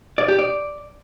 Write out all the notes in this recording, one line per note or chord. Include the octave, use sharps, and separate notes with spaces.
D5
G4
D5